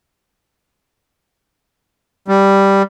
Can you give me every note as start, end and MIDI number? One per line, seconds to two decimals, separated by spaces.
2.28 2.82 55